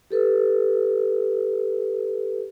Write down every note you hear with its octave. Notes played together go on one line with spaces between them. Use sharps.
G4 A4 B4